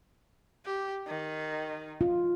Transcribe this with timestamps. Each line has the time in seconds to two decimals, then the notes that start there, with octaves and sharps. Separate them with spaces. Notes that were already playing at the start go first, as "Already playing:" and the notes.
0.65 G4
1.07 D#3
2.01 F4